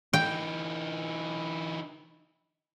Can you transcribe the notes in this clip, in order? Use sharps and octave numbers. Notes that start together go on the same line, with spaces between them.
E3 D#4 G5